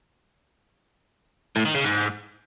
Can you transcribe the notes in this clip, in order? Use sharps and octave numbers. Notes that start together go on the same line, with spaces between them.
A2
D#3
C#3
G#2